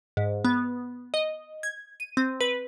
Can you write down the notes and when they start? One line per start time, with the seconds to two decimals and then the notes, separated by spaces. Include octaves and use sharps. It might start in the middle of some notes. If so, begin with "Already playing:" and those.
0.17 G#2
0.45 B3
1.14 D#5
1.63 G#6
2.00 D#7
2.17 C4
2.41 B4